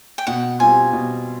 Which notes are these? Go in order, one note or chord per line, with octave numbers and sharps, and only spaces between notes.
G5
B2 F#5
G3 C4 F4 G#5
B2